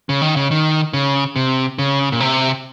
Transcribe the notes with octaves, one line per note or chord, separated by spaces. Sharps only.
C#3
D#3
C#3
D#3
C#3
C3
C#3
A#2
C3